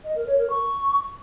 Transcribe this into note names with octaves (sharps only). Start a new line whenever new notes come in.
D#5
A#4
C#5
A#4
C#6